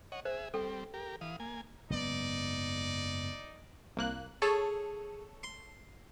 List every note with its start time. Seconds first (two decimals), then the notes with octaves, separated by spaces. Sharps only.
0.12 C#5 D#5 F#5
0.25 G#4 C5 E5
0.54 G3 C4 A4 G5
0.94 G4 A#4
1.21 E3 F5 D#6
1.40 A#3 G#5
1.90 F#1 G#2 B3 D#4 D5
3.97 C2 A#3 F#6
4.42 G#4 A4 C#5
5.43 C6